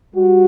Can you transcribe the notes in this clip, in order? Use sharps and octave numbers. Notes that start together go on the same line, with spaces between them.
G3 F#4